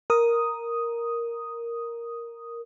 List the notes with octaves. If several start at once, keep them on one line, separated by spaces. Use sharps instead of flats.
A#4 D#6